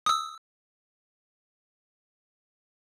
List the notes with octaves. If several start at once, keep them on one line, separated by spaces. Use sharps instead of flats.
D#6 E6